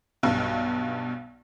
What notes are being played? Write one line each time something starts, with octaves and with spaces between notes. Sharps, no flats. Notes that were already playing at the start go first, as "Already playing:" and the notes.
B1 G2 B2